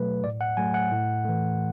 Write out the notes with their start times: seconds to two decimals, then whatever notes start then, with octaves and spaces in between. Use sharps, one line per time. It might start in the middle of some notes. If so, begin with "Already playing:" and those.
Already playing: B2 F#3 A3 B4
0.24 A2 D5
0.41 F#5
0.57 F#3 A3 G#5
0.74 F#5
0.91 A2
1.25 E3 A3